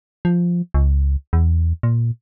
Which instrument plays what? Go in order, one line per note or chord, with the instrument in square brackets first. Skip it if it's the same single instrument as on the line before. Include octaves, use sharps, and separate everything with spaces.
[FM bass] F3
C#2
E2
A#2